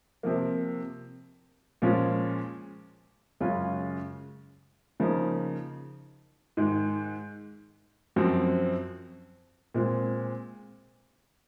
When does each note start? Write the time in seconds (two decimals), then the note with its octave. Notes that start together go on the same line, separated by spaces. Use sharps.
0.23 C3 F3 A#3
1.82 A#2 F3 G#3 C#4 F4
3.40 F#2 C#3 G#3 C#4 F4
5.00 C#3 F3 A#3 D#4
6.57 G#2 D#3 G#3
8.16 F#2 F3 C4 F#4
9.74 A#2 G#3 C4